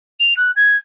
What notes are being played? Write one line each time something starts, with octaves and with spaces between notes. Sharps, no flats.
F7
F#6
G#6